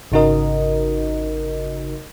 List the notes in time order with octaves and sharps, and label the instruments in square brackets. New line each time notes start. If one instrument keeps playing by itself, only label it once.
[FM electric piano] G#1 C#3 D#4 F#4 A#4 D#5